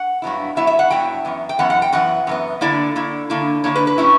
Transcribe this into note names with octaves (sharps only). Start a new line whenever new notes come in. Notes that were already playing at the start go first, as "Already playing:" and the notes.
Already playing: F#5
G2 F#3 B3 E4
G2 F#3 B3 E4 E5
E5
F#5
G2 F#3 B3 E4 G5
F#2 E3 B3
G5
F#2 E3 B3 F#5
F#5
G5
F#2 E3 B3 F#5
F#2 E3 B3
D3 A#3 E4 D5
D3 A#3 E4
D3 A#3 E4
D3 A#3 E4 C#5
B4
B4
A#2 G3 C#4 E4